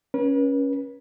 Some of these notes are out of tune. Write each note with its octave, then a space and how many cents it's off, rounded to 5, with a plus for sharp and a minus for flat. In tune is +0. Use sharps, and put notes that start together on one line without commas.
C#4 +0 B4 -40